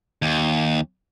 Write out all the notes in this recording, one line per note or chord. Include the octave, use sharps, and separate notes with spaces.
D#2